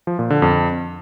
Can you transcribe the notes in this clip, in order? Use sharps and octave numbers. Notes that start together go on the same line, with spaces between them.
F3
A#2
D3
F2